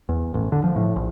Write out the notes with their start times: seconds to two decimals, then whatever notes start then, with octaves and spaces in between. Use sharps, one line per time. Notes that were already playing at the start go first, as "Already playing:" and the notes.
0.09 E2
0.34 A1
0.52 D3
0.64 F3
0.76 A2
0.96 A#1